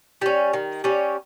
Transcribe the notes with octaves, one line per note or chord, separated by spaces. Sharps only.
G3 C#4
D#3
G3 C#4